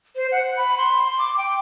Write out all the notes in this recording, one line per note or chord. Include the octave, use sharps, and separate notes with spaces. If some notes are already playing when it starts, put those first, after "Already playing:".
C5
F#5
B5
C6
D6
G5